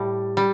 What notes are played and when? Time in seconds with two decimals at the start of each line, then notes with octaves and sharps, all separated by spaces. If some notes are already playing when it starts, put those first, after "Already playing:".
Already playing: A2 G3
0.37 G3